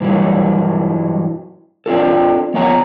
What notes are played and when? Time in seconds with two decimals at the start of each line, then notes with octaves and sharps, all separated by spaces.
0.01 G2 E3 F#3 G3
1.86 C4 D4 F4 A4
2.54 F3 B3 C#5 F#5 G#5 A#5